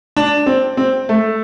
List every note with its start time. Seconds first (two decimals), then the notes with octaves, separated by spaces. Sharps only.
0.17 D4
0.46 C4
0.77 C4
1.09 A3